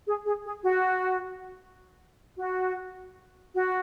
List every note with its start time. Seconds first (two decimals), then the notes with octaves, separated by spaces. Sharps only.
0.06 G#4
0.25 G#4
0.44 G#4
0.64 F#4
2.38 F#4
3.54 F#4